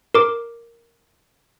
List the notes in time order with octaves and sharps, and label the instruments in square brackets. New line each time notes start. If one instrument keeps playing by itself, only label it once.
[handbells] A#4 D6